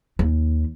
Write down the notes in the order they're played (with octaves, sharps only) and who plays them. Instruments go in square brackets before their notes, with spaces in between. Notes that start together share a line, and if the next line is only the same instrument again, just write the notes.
[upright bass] D#2